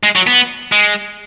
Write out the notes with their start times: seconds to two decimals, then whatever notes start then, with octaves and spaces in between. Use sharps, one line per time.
0.03 G#3
0.16 F#3
0.27 B3
0.72 G#3